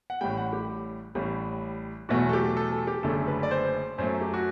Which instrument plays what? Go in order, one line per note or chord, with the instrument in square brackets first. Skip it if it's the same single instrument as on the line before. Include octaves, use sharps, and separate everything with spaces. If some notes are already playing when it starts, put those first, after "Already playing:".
[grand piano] F#5
A1 A2 G3 G5
F#5
G4
A1 A2 G3
E2 B2 F#3 A3 F#4
A4
G4
A4
A4
G4
F#1 F#2 D3 A3 A4
B4
D5
C5
F#2 F#3 A3 C5
A4
G4
F#4